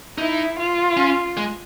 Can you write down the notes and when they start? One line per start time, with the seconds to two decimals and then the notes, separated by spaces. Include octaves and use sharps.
0.17 D#4 E4
0.58 F4
0.97 C#4
1.37 G#3